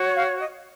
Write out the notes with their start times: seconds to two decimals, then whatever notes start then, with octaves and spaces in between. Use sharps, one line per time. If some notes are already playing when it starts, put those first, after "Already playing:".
Already playing: F#4 C#5
0.15 F5
0.39 D#5